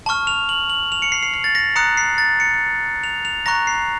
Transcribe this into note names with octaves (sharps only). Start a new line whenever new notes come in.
A5 C#6 F6
F7
F#7
F#7
F7
C#7
C7
C7
C7
A6
A#6
A#5 D#6 F#6 C#7
C7
A6
C#7
F7
F7
A#5 C#6 F#6 A#6
C7